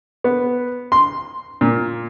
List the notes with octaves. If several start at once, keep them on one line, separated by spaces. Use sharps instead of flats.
B3
C6
A#2